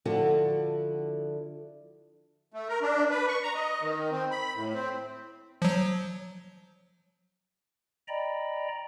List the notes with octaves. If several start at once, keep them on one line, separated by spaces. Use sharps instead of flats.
D3 F3 E4 F#4 A4
A3
A#4
D4
B4
C#6
A#5
D#5
D#3
C4
B5
A2
C4
F3 F#3
D5 D#5 G5 A#5 B5